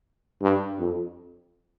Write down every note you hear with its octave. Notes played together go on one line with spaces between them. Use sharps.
G2
F2